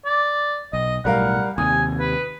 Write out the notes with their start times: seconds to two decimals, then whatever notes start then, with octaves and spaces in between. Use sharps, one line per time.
0.05 D5
0.73 B1 D#5
1.05 B1 A2 G3 A#4 F5 F#5
1.58 D#2 C3 G#5 D#6
1.99 B4